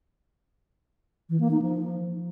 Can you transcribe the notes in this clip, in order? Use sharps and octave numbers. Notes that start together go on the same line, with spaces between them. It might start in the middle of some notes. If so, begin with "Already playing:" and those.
E3
A#3
D#4
F3